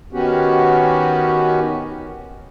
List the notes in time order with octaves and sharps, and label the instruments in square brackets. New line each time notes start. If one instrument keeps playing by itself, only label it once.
[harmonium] D#3 B3 C#4 F#4 G4